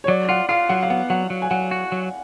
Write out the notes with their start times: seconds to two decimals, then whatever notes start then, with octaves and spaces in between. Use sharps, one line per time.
0.04 C#5
0.08 F#3 D5
0.29 F4 F#5
0.49 F4 F5
0.69 F#3 F#5
0.83 F5
0.90 B3 F#5
1.10 F#3 F#5
1.30 F#3
1.42 G#5
1.51 F#3 F#5
1.71 F#4
1.92 F#3